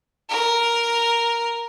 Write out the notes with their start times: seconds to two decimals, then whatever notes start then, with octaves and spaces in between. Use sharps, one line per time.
0.29 A#4